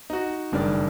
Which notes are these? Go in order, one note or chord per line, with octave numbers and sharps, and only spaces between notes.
D#4 F#4
F#1 G2 D#3 D5